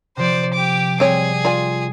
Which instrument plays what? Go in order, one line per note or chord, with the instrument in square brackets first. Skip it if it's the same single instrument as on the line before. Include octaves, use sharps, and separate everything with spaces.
[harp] C3 F3 [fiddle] C5 D5
[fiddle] G4 D6
[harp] G3 [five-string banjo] C4 C#5 [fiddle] G#4
[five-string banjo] F4 D5 G#5